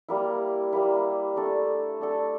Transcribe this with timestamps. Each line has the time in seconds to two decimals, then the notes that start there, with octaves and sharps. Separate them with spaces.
0.09 G3 A#3 E4
0.73 G3 A#3 E4
1.36 A3 D4 A4
2.00 A3 D4 A4